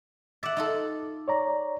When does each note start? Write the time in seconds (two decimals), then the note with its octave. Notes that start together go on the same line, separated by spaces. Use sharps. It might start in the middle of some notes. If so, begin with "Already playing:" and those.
0.43 E5 F#5 D6 A6
0.57 D#4 F4 A4
1.28 C#5 D5 A#5